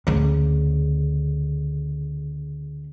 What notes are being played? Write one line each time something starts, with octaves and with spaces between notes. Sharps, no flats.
D2 C#3